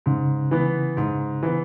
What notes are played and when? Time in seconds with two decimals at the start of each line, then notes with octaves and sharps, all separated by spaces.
0.06 G#2 C#3
0.51 E3 B3
0.97 G#2
1.43 E3 B3